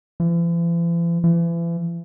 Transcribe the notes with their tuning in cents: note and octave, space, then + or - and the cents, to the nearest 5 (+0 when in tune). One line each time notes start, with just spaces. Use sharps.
E3 +45
E3 +40